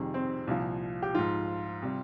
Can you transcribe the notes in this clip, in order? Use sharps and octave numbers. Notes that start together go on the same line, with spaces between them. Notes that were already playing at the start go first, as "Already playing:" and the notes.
Already playing: F2 C3 D#3 G3 G#4
C4
C2 A#2 F3
G4
G#2 F3 F4
C3 G3